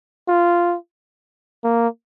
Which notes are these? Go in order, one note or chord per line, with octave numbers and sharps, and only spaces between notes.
F4
A#3